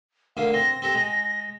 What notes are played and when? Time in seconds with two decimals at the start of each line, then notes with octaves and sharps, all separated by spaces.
0.37 D2 D3 A#3 F5
0.54 C4 A#6
0.82 C4 G4 A4
0.95 G#3